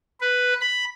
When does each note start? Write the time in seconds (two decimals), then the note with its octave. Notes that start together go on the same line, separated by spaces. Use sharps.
0.21 B4
0.61 B5